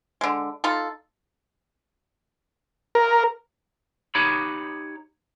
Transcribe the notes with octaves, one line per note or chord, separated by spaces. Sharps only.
D3 G#3
D#4 F4 A4
A#4
D#4 G4 C#5 B5